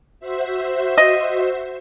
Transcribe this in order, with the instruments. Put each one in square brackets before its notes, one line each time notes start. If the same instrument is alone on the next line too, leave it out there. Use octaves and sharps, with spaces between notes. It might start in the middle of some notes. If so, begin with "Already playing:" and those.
[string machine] F#4 C5 E5
[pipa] D#5